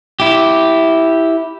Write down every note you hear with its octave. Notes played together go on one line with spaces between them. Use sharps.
E4 G4